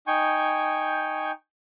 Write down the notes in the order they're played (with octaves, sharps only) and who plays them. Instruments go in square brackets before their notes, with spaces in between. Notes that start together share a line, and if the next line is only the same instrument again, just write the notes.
[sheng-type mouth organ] D#4 G5 G#5 C#6 G6